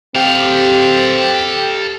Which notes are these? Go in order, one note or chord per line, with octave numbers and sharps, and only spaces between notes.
C4 G4 A4 F5